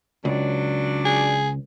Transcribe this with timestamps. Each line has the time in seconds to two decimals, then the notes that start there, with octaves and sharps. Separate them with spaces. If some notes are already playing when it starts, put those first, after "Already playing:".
0.25 C#2 F#3 D4 D5
1.05 G#4